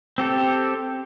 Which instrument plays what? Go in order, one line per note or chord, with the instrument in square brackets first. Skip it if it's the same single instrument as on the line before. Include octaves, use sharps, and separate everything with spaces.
[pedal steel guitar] C4 G4 A4